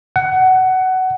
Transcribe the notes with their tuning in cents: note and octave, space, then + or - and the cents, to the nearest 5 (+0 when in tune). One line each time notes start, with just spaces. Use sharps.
F#5 +20